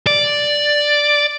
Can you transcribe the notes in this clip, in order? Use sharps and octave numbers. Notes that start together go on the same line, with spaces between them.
D5